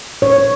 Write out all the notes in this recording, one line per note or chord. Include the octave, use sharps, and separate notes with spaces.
C#5